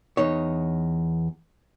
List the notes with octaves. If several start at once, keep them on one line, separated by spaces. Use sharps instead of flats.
E2 D#4 C#5